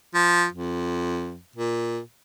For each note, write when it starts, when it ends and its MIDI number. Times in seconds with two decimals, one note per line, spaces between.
0.15 0.46 53
0.53 1.39 41
1.56 2.00 46